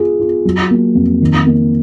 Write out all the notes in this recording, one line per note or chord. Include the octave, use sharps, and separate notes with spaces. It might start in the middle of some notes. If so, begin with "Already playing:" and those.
Already playing: F4 G#4
F4
F#3
A#3
F2
D#3
A#3